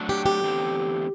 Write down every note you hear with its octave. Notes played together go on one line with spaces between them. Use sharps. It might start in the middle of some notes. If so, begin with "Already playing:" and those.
Already playing: F#3 A3 D4 F#4 A4
G4
G4
E2 D3 A3 C4